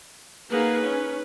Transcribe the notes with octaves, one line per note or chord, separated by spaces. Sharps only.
A#3 D#4 G#4 B4 F#5
C#4